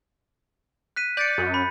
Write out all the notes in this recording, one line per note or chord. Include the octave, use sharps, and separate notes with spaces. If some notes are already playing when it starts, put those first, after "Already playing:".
F#6 B6 D#7
D5 G6 A6 C#7
F#2
B5